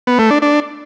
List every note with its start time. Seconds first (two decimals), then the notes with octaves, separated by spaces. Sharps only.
0.07 B3
0.19 A3
0.30 D4
0.42 D4